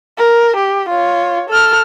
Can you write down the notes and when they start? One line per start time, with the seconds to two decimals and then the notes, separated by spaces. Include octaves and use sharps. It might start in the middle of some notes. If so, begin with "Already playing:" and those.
0.18 A#4
0.57 G4
0.89 F4 C#5
1.50 A4 F6